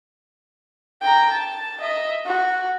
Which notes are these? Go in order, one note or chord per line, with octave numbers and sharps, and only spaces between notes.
G5 A#5
A5
D#5 E5
F#4